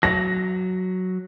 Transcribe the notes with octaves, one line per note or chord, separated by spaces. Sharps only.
F#3 A#6